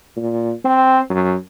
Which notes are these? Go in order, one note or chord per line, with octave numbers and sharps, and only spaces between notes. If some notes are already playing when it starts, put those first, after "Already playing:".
A#2
C4
F#2